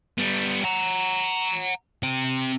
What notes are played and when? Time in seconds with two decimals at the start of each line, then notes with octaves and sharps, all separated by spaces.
0.18 G3 B3
0.64 F#5 A#5
2.03 C4 G4